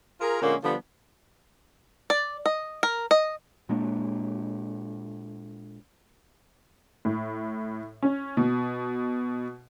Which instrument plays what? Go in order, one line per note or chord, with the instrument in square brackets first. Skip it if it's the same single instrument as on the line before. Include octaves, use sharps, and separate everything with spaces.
[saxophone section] F4 G#4 A#4
A#2 D3 G#3 A#3 C#4
D3 F3 G3 B3 D4
[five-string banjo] D5
D#5
A#4
D#5
[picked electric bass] A#2 G#3 A#3 D4
[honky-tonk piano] A2
C#4
B2